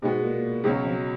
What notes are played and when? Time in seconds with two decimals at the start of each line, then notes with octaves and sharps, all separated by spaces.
0.02 G#2 B2 G#3 B3
0.12 G#2
0.22 A#2
0.33 A#2
0.63 C#2 G#2 B2 F#3 C#4
0.84 F2